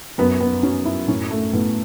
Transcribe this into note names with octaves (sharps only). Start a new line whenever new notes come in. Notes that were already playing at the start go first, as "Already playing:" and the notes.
F#2 B3
B3
F#3 C#4
E4
A2 C#4
A3
A2 B3